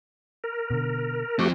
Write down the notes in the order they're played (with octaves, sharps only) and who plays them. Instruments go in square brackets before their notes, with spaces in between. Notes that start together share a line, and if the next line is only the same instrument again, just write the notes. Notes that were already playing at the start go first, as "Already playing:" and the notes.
[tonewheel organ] A#4
[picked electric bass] B2 D3
[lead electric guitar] F3 C4 [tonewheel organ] A3 F#4 G4